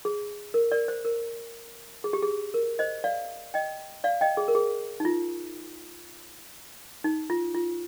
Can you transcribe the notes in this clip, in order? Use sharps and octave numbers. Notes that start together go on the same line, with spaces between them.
G#4
A#4
A#4 D5
C5
A#4
G#4
G4
G#4
A#4
C5 D#5
D5 F5
D#5 G5
D5 F5
D#5 G5
G#4
A#4
G#4
D#4
F4
D#4
F4
F4